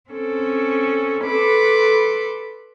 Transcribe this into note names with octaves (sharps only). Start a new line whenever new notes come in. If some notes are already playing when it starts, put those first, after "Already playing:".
C4 C#4 A4
A4 B4 B5 C6 D6